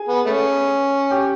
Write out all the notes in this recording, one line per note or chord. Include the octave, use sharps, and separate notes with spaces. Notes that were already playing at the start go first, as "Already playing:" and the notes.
Already playing: G#4 G#5
B3
A3 C#4
G4 G5